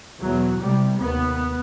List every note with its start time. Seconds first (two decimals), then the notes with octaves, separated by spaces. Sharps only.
0.20 E2 B2 F#3
0.59 C2 C3 G3
0.97 D#2 B3